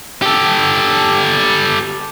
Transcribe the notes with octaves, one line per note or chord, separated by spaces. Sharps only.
G4 A4